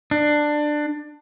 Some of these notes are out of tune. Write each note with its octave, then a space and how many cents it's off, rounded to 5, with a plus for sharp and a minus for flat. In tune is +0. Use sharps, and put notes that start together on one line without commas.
D4 +15